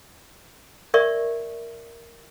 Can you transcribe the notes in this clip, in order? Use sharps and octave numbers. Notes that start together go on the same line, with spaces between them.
A#4 D5 E5 C#6